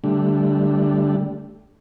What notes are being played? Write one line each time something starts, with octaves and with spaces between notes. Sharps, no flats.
D3 G3 A3